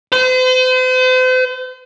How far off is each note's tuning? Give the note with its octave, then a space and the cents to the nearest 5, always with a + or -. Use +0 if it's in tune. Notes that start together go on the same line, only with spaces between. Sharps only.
C5 -40